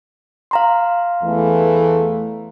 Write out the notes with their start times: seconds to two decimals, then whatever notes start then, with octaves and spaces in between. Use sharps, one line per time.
0.51 F5 A#5 C6
1.23 E2 E3 A3